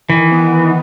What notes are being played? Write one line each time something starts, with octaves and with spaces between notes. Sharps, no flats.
D#3 E3
B3
D#3